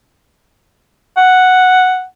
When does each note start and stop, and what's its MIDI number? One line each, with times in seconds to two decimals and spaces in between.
1.17 2.04 78